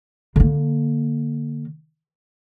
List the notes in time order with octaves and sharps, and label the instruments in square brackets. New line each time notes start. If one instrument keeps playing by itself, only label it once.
[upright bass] D3 A#3